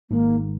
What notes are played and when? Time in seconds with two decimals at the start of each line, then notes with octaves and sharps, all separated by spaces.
0.10 G#1 G#2 D#3 G#3 A#3